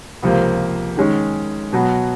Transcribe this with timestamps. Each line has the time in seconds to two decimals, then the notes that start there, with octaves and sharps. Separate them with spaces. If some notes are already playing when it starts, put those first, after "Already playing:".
0.22 C#2 C3 F3 A#3
0.97 D#3 G#3 C#4
1.73 B2 F#3 B3